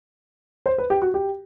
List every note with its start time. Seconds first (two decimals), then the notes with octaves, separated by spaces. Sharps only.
0.66 C5
0.78 B4
0.90 G4
1.02 F#4
1.14 G4